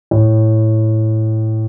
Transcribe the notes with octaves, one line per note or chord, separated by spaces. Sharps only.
A2